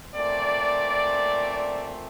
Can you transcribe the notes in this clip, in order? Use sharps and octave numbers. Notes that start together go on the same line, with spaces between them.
A#2 A3 C4 D5